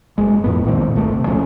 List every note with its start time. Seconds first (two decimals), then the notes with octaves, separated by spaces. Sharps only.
0.18 F#1 G#3
0.44 F2 A2 B3
0.65 C2 A#2 D#3 C4
0.96 G1 A3
1.12 C3
1.27 D2 F3 A3 C#4